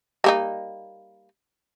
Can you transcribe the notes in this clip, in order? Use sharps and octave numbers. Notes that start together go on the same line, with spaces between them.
G3 A#3 D#4